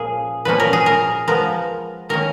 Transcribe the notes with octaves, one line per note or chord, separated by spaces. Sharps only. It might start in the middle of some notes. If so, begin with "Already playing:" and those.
Already playing: A#2 F3 A#3 C#4 G#4 A#4
A#2 F3 A#3 C#4 B4
A#4
G#4
A#4
F3 G#3 B3 A#4
D#3 A#3 C#4 A#4